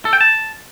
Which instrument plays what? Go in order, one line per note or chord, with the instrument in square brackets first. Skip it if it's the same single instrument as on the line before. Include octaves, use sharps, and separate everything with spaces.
[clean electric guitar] A4
G5
A5